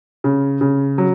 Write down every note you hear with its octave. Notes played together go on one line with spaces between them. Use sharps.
C#3
C#3
F#3